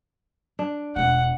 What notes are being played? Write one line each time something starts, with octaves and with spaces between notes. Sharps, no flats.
D4
E1 F4 F#5